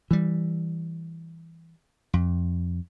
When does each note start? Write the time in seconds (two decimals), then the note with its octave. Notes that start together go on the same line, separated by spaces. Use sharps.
0.11 E3 G3
2.13 F2